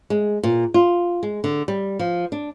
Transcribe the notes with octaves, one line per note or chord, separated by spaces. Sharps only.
G#3
A#2
F4
G#3
D3
G3
F3
D4